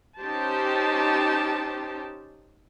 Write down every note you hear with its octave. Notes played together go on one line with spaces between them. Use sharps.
C#4 D#4 G4 C5 A5